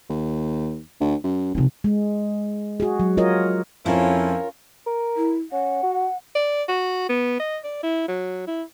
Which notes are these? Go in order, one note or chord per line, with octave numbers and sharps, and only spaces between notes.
D#2
D2
F#2
G#1 C3 F3
G#3
F#4 G#4
F#3
F4 F#4 A#4 C#5 D#5
F2 F3 C#4 E4 F4 A#4 C#5
A#4
E4
C#4 F#5
F#4
D5
F#4
B3
D#5
D5
E4
F#3
E4